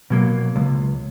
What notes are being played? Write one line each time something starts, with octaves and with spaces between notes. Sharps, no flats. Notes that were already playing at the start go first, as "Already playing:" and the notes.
B2 F#3 A#3
C#2